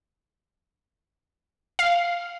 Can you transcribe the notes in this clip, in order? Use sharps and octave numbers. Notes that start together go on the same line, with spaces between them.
F5